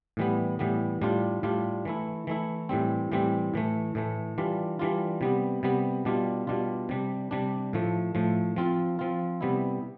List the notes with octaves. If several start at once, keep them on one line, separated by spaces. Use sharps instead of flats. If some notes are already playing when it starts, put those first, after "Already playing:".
A2 E3 G3 B3
A2 E3 G3 B3
A2 G3 D4 F4
A2 G3 D4 F4
E3 A3 E4
E3 A3 E4
A2 E3 G3 C4
A2 E3 G3 C4
A2 E3 A3
A2 E3 A3
E3 G3 D4 F4
E3 G3 D4 F4
C3 G3 B3
C3 G3 B3
B2 G3 D4 F4
B2 G3 D4 F4
C3 G3 D4
C3 G3 D4
A2 F3 A3
A2 F3 A3
F3 C4 F4
F3 C4 F4
C3 G3 B3 E4